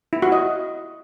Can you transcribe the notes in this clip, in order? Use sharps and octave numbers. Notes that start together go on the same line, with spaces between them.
E4
F#4
D#5